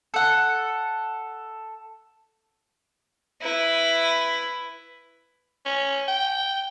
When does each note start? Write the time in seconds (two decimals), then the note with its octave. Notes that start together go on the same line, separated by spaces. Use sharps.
0.14 A4 F#5
3.42 E4 B4
5.65 C#4
6.08 G5